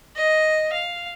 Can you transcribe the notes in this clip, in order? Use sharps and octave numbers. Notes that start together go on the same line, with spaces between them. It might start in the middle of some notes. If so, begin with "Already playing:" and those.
D#5
F5